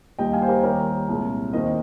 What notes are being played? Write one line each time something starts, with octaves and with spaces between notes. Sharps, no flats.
D#2 D#3 G3 A#3 D#5 G5
F5 G#5
C5
G4 A#4
D#2 D#3 G3 A#3 A#4 C#5
C2 A#2 G#3
D#2 D#3 A#3 C5 D#5